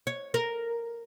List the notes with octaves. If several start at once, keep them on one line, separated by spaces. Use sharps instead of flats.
C#5
A#4